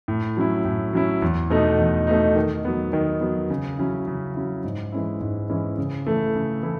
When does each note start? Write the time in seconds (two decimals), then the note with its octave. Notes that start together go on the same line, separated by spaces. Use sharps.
0.08 A2
0.37 F#3 C#4 E4
0.65 A2
0.93 F#3 C#4 E4
1.22 E2
1.50 B2 A3 D#4
1.79 E2
2.07 B2 A3 D#4
2.36 D#3
2.65 F#3 B3
2.93 D#3
3.21 F#3 B3
3.50 C#3
3.78 F#3 C#4 E4
4.07 C#3
4.35 F#3 C#4 E4
4.64 G#2
4.92 E3 G#3 C#4 E4
5.21 G#2
5.49 E3 G#3 C#4 E4
5.78 C#3
6.06 E3 A3 E4
6.35 C#3
6.63 E3 A3 E4